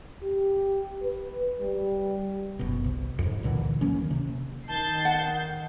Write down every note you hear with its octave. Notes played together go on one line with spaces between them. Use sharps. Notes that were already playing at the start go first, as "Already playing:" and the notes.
G4
B4
G3
F#1 B2
C2
F2 G#2
C#2 A#2 D3 E3
D#3 F#3 A#3 C#4
C3
D#3 A5 G6 C7
F#5